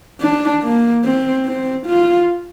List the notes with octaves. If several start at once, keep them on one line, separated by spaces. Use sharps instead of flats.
D4
A#3
C4
C4
F4